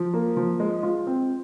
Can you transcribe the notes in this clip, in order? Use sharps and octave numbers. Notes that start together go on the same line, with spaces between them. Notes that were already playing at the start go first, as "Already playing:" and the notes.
Already playing: F3
A#3
F3
G#3
F4
C4